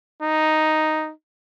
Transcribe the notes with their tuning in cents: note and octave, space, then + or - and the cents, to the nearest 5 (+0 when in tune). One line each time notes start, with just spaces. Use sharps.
D#4 +0